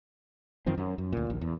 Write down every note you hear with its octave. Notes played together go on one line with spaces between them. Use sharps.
F#2 D#3 F3 C4
F#2 F#3
F#2
D2 A#2
A#1 D#2
E2